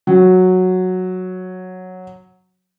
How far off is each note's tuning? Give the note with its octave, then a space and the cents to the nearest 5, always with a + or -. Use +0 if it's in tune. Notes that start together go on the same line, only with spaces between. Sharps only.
F#3 -5